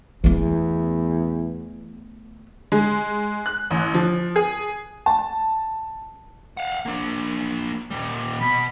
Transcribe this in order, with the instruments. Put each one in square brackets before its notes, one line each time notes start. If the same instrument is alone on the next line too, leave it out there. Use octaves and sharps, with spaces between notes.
[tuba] E2 [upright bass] A3 B3
[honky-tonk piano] G#3
F#6
A1
F3
G#4
A5
[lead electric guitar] F5 F#5
A#3 D4
A#2 G3
[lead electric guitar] B2 [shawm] B5